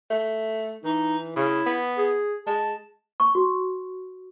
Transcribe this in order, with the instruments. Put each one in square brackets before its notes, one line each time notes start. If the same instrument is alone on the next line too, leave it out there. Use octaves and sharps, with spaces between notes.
[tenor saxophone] A3
[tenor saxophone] E3 [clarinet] D#4
[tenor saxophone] C#3 [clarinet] E4
[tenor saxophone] B3
[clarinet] G#4
[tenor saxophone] G#3 [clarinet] A5
[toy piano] C#6
F#4